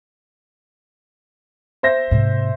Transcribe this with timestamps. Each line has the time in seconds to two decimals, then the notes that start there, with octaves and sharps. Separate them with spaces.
1.83 C5 E5 A#6
2.11 G#2 C3